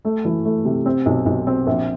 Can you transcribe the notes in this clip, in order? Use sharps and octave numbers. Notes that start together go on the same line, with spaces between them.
A3
E3
A3
C3
C4
B1
B1
C4
A#1